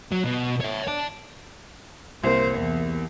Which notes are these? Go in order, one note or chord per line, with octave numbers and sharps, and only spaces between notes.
F#3
B2
C#5 E5
D5 A5
C2 A#3 C5
E2